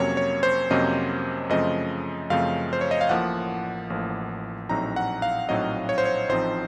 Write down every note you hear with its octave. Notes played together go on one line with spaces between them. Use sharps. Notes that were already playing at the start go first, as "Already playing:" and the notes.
Already playing: F2 C3 F#3 A#3 C#4 C#5
C#5
C5
F2 C3 F#3 A#3 C#4 D#5
F#2 C#3 F3 A3 C4 D#5
F#2 C#3 F3 A3 C4 F5
C5
C#5
D#5
F5
A1 A2 F3 A#3 F#5
A1 A2 F3 A#3
A#1 A2 F#3 C4 D#4 A#5
F#5
F5
A#1 A2 F#3 C4 D#4 D#5
C#5
C5
C#5
A1 A2 F3 C4 D#4 C5